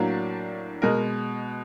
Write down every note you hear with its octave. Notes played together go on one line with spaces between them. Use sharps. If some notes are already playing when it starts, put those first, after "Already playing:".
Already playing: A2 F#3 A#3 D4
B2 G#3 A#4